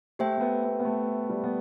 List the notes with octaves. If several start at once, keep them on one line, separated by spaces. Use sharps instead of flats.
A3 G4 C5 E5 G5
A3
B3
B3
B3
A3
G3
B3